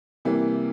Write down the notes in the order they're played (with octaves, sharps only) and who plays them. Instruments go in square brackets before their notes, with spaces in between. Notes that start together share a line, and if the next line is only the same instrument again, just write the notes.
[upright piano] C3 E3 G3 A#3